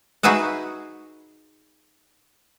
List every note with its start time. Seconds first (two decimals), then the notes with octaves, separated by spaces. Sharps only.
0.23 D#4 F#4 G#4 B4 E5 F#5